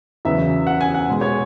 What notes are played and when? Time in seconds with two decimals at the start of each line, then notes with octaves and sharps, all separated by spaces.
0.25 E2 C#3 F#3 B3 E5
0.67 F#5
0.81 G#5
0.94 F#5
1.08 B2 G#3 B3
1.21 C#5